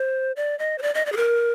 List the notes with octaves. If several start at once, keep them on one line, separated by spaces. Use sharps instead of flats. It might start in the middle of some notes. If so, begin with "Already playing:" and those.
Already playing: C5
D5
D#5
C5
D5
D#5
D5
G#4
A#4